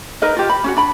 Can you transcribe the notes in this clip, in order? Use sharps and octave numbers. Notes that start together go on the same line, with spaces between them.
D#4 A#4 B4 D#5
F4 G4
B5
C#4 E4 F#4
D4 B5